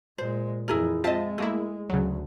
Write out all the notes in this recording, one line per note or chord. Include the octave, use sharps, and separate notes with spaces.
A#2 G#3 C5
F2 E3 E4 G#4 A#4
G#3 C4 F4 D#5 E5 A5
A3 A#3 E4 G#4
D2 C#3 F#3